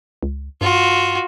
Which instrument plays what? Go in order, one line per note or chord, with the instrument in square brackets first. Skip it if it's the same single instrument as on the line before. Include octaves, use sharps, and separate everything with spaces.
[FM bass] C#2
[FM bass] G2 [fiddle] F4 F#4